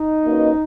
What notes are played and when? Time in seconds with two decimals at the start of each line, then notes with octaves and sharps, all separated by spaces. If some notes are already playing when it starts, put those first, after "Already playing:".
Already playing: D#4
0.25 A#3 C#4 F#4 B4 D#5